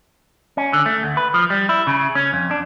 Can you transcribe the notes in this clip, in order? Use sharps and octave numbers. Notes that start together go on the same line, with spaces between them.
C#4
D3
A3
D2
B4
F3
G3
E4
C#3
C#4
F2
D4